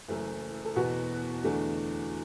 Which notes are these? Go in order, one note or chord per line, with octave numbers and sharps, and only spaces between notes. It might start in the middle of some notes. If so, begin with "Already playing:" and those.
F#1 F#2 E3 A3 E4
A4
E2 B2 B3 F#4
E2 D3 A3 D4